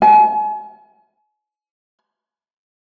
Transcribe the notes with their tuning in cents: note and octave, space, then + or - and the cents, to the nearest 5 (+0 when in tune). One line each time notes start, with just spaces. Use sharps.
G#5 +40